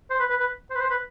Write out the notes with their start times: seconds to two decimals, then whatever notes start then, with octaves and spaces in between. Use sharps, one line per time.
0.10 C5
0.20 B4
0.30 B4
0.40 B4
0.70 C5
0.75 B4
0.80 C5
0.91 B4